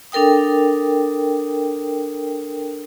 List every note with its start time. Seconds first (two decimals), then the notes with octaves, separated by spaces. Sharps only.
0.12 D4 A4 A#4 G5 D#6